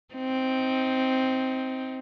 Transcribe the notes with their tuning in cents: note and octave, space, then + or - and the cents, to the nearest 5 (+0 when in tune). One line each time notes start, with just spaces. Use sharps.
C4 +0 D#4 +25